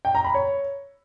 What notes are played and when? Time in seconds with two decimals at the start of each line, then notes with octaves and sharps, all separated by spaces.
0.05 G5
0.15 A#5
0.25 B5
0.34 C#5